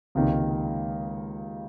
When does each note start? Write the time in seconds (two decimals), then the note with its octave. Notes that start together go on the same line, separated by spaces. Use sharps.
0.15 C#2 C3 D#3 A#3